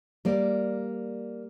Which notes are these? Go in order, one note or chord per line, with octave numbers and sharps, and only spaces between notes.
G3 A#3 D5